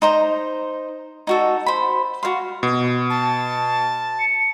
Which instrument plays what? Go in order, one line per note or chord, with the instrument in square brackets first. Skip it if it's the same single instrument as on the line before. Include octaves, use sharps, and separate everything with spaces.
[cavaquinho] D#4 C5 A#5
D#4 F#4 A4
C5 B5
F#4 A#4 F5 C6
[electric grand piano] B2
[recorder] A5
[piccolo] C#7